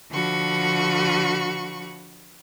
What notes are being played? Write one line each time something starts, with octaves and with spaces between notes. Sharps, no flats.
D3 F3 F#4 B5 C#6